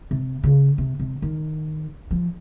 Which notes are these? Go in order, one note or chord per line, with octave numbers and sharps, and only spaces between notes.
C3
C#3
C3
C3
D#3
F3